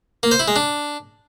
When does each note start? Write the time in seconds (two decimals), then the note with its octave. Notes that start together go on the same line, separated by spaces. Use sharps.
0.23 A#3
0.31 C5
0.39 E4
0.48 G#3
0.56 D4